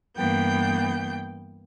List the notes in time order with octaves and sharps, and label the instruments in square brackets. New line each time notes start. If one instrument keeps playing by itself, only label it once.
[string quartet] G2 E3 A#3 B3 G5 G6